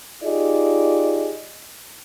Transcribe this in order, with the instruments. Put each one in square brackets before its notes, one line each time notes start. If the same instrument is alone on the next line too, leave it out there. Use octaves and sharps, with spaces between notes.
[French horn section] D#4 F4 G4 G#4 D5 D#5